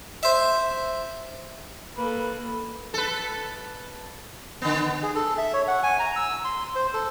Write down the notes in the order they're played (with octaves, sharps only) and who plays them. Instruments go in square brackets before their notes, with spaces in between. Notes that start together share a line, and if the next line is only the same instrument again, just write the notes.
[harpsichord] C5 E5
[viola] A#3 A4 [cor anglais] B4
[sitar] A4 B4
D3 B3
[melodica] G#4
A4
E5
C#5
F#5
G#5
A#5
E6
C6
C5
A4